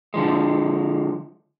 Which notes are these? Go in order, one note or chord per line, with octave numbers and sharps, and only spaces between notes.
D3 F3 G#3